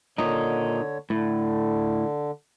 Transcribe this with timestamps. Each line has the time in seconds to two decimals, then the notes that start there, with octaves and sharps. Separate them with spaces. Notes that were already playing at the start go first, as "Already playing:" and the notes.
0.18 A#2 D3 D#4 C#5
1.10 A2 D3